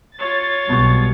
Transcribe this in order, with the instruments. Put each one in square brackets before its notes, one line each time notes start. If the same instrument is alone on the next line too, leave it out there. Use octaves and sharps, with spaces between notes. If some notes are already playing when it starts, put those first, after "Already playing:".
[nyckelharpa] F4 C#5 [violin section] A6
[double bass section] B1 G3 [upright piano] B2 C#6